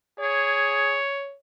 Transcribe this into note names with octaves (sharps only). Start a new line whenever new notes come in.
G#4 C#5